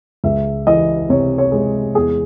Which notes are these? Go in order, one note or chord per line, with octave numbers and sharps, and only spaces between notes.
C#2 E5
E3 D#5
C3 C#5
C#5
G#3
E2 G#4